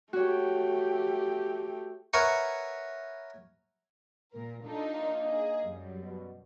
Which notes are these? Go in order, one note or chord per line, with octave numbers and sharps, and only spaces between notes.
A3 F#4 G4 C#5
A#4 B4 C#5 E5 F#5 G#5
A#2 A#4
D4 D#4 F4 A4
A#3 D#5
G#4
F#2 G3
B2